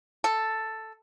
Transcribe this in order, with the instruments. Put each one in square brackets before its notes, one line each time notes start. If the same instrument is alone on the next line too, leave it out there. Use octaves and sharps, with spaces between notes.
[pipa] A4